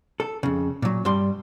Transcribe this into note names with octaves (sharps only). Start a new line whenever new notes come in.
A4
F2 C#3
A#2 F#3
G2 G3 C6